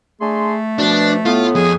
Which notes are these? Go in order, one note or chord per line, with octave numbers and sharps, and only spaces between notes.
A3 D4 G#4 C6
B2 F3 D4
A2 B3 F4
F2 G#4